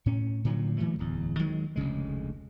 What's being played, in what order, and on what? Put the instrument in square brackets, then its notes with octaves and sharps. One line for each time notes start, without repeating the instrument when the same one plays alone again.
[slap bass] A2 C#4
A2 D3 F3 F#3
A#2 E3 F#3 A3
D1 E2
D#3 F#3 G#3
F1 D2 C#3 G#3